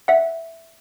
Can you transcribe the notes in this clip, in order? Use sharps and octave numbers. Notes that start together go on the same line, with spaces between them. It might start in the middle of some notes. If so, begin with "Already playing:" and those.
E5 F#5